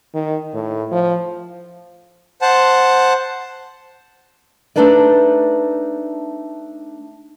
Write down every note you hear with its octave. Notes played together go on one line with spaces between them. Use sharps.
D#3
A2
F3
C5 F#5 A5
A3 B3 D4 D#4 B4 D5